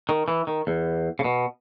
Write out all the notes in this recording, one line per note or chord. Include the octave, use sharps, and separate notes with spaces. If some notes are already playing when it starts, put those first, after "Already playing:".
D#3
E3
D#3
E2
C#3
B2